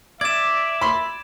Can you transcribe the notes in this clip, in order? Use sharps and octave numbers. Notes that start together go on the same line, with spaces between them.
D5 E5 G#6 E7
B5 C6